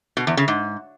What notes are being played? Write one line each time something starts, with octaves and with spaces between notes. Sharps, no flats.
B2
E2
C#3
G#2